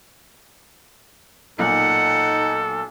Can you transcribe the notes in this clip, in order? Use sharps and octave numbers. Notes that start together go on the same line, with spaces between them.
B1 A#2 D#4 A4 F#5